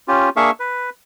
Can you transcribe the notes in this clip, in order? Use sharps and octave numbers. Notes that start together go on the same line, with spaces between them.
C#4 F4 G4
A#3 D4 G#4 E5 F5 C#6
B4